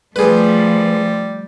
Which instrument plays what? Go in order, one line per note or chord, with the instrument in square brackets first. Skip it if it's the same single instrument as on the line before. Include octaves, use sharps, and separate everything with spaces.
[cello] F3 A3 [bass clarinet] G3 [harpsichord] G#4 B4